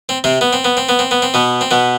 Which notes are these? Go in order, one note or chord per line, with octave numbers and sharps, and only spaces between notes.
C4
C3 C4
B3
C4
B3
C4
B3
C4
B3
C4
B2 B3
C4
B2 B3